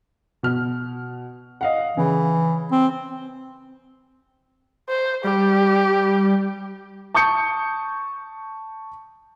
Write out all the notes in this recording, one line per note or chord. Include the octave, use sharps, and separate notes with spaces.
B2 F6
D#5 F5 F#5
C#3 E3
C4
C5
G3 G4
A5 C#6 D#6 G6 C#7